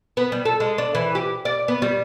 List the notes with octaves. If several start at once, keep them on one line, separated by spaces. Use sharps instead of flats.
B3
G3
A4
G#3
D4
E3
G4
D5
B3
G3